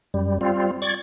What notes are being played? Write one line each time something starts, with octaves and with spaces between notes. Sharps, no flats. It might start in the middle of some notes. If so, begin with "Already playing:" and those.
F#2 G3
G3 C4 F4
D5 C#6 G#6 A6